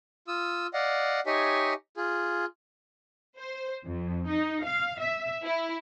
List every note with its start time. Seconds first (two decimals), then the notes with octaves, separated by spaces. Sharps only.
0.28 F4 D#6 E6
0.74 D5 D#5 F5 F#5
1.26 D#4 G4 C#5 D#5 E5 G#5
1.97 F4 G#4
3.38 C5
3.84 F2
4.26 D#4
4.63 F5
4.98 E5
5.44 E4